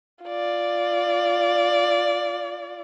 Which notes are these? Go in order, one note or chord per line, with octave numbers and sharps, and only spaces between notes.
F4 D5